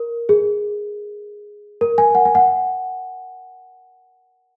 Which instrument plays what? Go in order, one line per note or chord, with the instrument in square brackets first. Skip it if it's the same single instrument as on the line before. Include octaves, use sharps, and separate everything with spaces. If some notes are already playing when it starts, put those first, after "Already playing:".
Already playing: [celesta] A#4
G#4
A#4
G#5
F#5
G#5
F#5